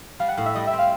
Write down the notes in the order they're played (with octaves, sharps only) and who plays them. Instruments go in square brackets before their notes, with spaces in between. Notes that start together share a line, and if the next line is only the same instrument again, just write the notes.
[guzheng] G3 [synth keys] F5
[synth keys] F#5
[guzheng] A2 [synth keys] F5
[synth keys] E5
[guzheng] G3 [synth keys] D#5
[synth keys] E5
[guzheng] C4
[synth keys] F5